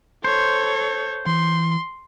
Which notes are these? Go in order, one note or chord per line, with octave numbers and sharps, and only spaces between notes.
A4 C5 C#5
E3 C6